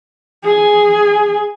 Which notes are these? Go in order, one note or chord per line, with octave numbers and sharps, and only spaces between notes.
G#4 G#5